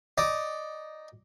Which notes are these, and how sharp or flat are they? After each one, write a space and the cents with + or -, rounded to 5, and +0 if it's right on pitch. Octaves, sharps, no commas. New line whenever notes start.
D#4 +0 D5 +0